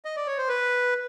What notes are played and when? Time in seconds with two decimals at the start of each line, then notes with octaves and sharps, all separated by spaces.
0.05 D#5
0.16 D5
0.27 C#5
0.38 C5
0.49 B4